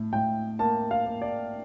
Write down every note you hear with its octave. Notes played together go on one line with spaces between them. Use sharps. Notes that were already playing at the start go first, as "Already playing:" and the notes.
Already playing: A2
A2 G5
A#3 A5
F5
A#3
D5